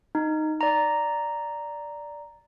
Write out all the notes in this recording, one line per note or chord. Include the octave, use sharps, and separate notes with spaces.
D#4
D5 A#5